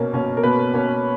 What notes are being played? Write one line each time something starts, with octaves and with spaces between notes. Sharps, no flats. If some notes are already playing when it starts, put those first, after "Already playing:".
Already playing: B2 A#3 C#4 A#4
B2 A#3 C#4
A#4
B2 A#3 C#4 B4
B2 A#3 C#4